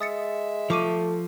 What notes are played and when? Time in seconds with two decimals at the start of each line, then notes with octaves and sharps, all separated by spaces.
0.01 G#3 E5 D#6 A6 C#7
0.70 F3 A3 C#6 D6 D#7